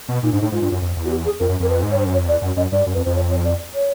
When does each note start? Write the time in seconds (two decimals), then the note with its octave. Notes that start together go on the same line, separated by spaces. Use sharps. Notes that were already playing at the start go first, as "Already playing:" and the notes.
0.08 B2
0.23 A#2 D#4
0.32 G#2 D4
0.40 A2 D#4
0.52 G#2 F4
0.62 G2
0.72 F#2
0.82 F2
0.97 E2
1.05 F#4
1.10 G4
1.25 G#4
1.40 F2 A#4
1.49 F#2
1.60 F2 A#4
1.69 B4
1.82 G#2
1.91 C#5
1.94 G2 C5
2.06 F#2
2.13 C#5
2.17 F2
2.27 E2 D5
2.42 F#2
2.56 F#2 D#5
2.72 G2 D5
2.86 F#2
2.94 F2 B4
3.05 F2 C5
3.15 C#5
3.30 C#5
3.44 D5
3.74 C#5